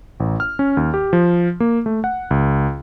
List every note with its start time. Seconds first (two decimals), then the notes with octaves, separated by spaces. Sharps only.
0.20 A1
0.40 F6
0.59 C#4
0.77 D#2
0.94 G4
1.13 F3
1.60 A#3
1.86 A3
2.04 F#5
2.31 C#2